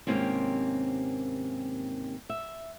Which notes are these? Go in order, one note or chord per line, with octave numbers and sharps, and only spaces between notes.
D#2 G#2 C3 A#3 C4 C#4
E5